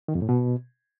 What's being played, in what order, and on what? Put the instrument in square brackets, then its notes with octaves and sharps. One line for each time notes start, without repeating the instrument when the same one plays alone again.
[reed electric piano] D#3
F2
A2
B2